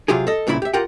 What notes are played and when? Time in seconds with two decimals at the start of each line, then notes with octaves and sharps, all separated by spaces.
0.08 C3 F#3 F4 G4 G#4
0.27 A4 D#5
0.47 G2 A#2 C#3 E4 B5
0.62 G4 E5
0.73 F4 G4 A#4 F#5 G5